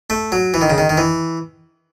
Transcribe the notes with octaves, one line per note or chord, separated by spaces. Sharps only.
A3
F#3
E3
D#3
C#3
D#3
D#3
E3